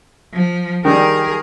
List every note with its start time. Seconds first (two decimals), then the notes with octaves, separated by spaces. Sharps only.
0.34 F3
0.85 D#3 G3 G#4 A#4